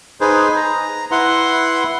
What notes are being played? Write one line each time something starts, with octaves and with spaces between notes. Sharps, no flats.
D#4 G#4 B4 C5
A#5
E4 B4 F#5 C6